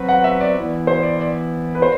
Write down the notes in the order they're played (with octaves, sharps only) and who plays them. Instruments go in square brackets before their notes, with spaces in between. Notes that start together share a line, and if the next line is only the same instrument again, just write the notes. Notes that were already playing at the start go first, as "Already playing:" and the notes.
Already playing: [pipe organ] F#3 C4 F#4 B4
[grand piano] F#5
E5
D5
[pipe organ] E3 B3 E4
[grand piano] C5
D5
D5
B4
C5